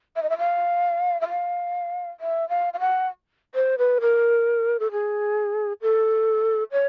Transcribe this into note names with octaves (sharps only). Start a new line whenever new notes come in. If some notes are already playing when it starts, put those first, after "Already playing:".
E5
D#5
E5
F5
E5
F5
E5
F5
F5
F#5
C5
B4
A#4
A4
G#4
A4
C#5